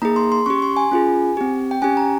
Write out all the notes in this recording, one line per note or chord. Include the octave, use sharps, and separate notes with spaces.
A#3 D#4 G#4 A#5
C6
C6
C#4 G4 C#6
C6
G#5
C#4 F4 G#4
C4 G4
G5
C#4 G4 G#5
A#5